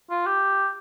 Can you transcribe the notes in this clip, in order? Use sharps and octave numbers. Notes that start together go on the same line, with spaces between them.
F4
G4